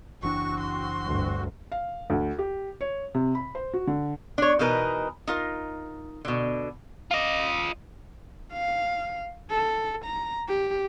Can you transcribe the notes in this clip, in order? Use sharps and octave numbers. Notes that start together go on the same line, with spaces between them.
F#1 E3 C4 D4 F#4 C#6
C6
G1 D2
F5
D2
G4
C#5
C3
B5
C5
F#4
D3
D4 C#5
B2 E3 D#4 A#4 B4
D#4 F4 A#4
B2 D3
F4 D#5
F5
A4
A#5
G4